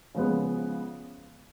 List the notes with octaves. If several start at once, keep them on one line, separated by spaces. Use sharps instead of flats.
C#3 F3 G#3 B3